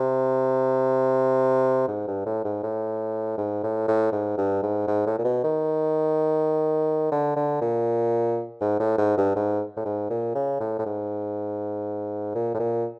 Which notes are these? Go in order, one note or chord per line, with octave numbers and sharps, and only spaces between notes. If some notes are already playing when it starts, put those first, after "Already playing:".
Already playing: C3
G#2
G2
A2
G#2
A2
G#2
A2
A2
G#2
G2
G#2
G#2
A2
A#2
B2
D#3
D3
D3
A#2
G#2
A2
G#2
G2
G#2
A2
G#2
A#2
C#3
A2
A2
G#2
A#2
A2
A#2